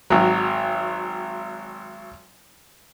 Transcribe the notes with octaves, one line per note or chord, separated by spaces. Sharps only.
G#1 F#3